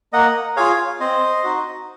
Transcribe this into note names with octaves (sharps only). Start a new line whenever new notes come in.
A#3 D#5 F#5
F4 G#4 C#5 F5
C4 C5 D#5
D#4 F#4